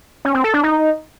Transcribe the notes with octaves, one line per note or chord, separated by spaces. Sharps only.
C#4
C4
A4
D4
D#4